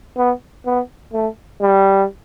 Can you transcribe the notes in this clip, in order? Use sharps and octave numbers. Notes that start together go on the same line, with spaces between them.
B3
B3
A3
G3